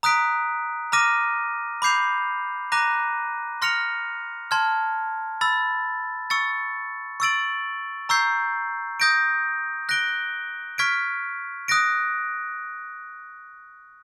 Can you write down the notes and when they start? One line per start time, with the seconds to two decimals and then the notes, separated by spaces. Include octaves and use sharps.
0.03 A#5 D#6 F#6 B6 D7
0.92 A#5 D6 F6 A#6 D#7
1.82 B5 D6 G6 C7 F7
2.72 A#5 D6 F#6 A#6 D#7
3.62 C6 F6 A#6 C#7 F7
4.51 A5 C6 F6 G#6
5.41 B5 E6 A6
6.30 C#6 E6 A6 C#7
7.20 C#6 E6 A6 D7 F#7
8.09 A#5 C#6 E6 G6 C7
9.00 D#6 G6 A#6 D7
9.89 F#6 A#6 D7 G7
10.78 C#6 F6 G#6 B6 D7
11.68 D#6 F#6 A#6 D7